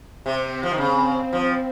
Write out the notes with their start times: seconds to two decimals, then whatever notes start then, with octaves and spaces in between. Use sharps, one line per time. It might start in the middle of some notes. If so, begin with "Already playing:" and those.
0.25 C3 C4
0.63 F3
0.71 D#3
0.78 C#3 C4
1.33 F3